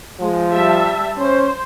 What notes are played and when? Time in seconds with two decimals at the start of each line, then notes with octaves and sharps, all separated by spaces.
0.20 F3 G#3
0.52 G3 E5 A5
1.18 C#4 C5